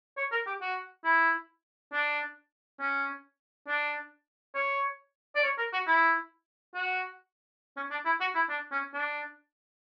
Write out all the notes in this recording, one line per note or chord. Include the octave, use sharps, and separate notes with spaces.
C#5
A#4
G4
F#4
E4
D4
C#4
D4
C#5
D5
C#5
A#4
F#4
E4
F#4
C#4
D4
E4
F#4
E4
D4
C#4
D4